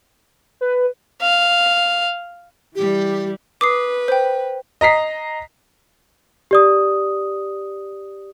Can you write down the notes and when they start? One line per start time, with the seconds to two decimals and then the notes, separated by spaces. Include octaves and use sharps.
0.61 B4
1.22 F5
2.75 E3 G3 G4
3.61 B4 D6 D#6 C7
4.08 C5 G5
4.81 D#5 A#5 B6 C7
6.51 G4 D5 D#6